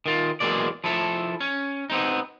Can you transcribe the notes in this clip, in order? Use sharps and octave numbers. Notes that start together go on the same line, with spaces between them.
D#3 F4
E2 F#3 G#3 A#3 D5
F3 E4 A4
C#4
B3 C4 D#4